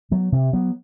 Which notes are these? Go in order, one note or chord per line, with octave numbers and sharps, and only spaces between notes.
F#3 B3
C3
F#3 B3